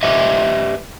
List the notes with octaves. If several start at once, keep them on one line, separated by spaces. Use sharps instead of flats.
G4 B4 D#5 E5